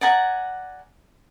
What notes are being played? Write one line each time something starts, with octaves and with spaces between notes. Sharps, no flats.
D5 F#5 G#5 A#5